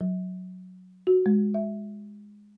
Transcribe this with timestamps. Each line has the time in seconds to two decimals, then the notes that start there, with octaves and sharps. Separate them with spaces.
0.01 F#3
1.07 F#4
1.26 G#3
1.54 E5